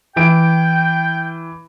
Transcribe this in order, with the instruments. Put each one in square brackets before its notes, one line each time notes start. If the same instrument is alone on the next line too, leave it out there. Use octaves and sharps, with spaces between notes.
[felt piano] E3 D7 [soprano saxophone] G5